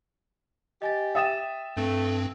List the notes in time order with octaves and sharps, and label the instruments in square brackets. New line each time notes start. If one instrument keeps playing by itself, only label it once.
[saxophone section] G4 [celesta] D#5 G#5 A6
[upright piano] E5 D#6 [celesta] G5 A6 E7
[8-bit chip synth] G2 C4 [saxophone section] A3